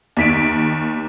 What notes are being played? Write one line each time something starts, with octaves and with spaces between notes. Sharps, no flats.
D#2 B6 D7